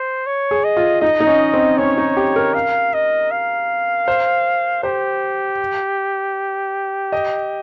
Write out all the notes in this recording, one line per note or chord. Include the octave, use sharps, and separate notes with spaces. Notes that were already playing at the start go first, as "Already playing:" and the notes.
Already playing: C5
C#5
G#4
D#5
F4
D#4 D#5
D#4
C#4
C4
C#4 C#5
D#4
G4
A#4
F5
D#5
F5
C5
G4 C5
D#5